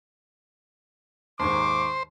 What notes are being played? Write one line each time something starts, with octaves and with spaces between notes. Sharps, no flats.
D#2 G#2 C5 C#6 D6